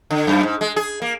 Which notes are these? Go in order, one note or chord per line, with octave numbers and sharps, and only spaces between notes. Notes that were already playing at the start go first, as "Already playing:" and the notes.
D3
F#2
G#2
G#3
G#4
A#3